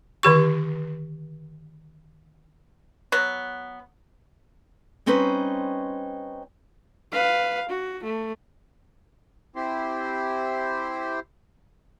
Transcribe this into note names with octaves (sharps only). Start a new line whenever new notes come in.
D3 D#3 G4 C#6
F#3 B3
G3 C4 C#4 D#4 B4 C5
B4 F5
F#4
A3
C4 E4 G4 C5